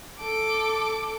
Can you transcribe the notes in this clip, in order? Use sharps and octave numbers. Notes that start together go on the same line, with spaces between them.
A4 D6